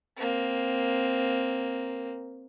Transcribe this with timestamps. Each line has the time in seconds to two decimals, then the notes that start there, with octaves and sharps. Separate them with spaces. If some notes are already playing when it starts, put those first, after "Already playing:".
0.16 A#3 C4